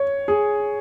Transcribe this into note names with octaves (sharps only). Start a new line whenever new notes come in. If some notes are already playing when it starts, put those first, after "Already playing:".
Already playing: C#5
G#4